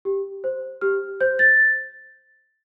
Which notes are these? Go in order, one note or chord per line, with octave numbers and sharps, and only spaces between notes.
G4
C5
G4 F6
C5 G6
A6